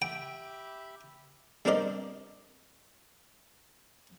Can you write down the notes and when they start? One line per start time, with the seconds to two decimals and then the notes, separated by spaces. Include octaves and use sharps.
0.02 G4 E5 G5 B5
1.65 G3 C4 D4 A#4 D5 D#5